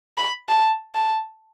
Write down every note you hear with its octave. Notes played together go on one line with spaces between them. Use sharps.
B5
A5
A5